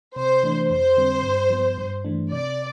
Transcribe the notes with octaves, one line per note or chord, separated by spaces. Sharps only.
C3 C5
E3 A3 D4
F2 C5
D3 G3 C4
G2
F3 B3
G2
E3 A3 D4
C3 D5